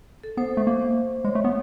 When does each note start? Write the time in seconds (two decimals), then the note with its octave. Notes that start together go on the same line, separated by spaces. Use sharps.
0.24 A4
0.37 B3 C5
0.57 A3
0.67 A#3
1.24 G#3 C#5
1.35 A3
1.44 B3